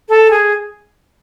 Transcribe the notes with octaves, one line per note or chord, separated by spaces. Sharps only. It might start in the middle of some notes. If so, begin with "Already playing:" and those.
A4
G#4